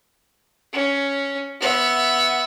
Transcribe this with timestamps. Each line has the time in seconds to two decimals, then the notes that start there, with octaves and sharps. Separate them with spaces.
0.73 C#4
1.60 B3 E5